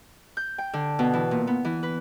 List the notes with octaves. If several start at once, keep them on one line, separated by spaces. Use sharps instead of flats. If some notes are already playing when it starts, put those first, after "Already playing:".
G6
G5
D3
B2
E3
A#2
B3
E3
B4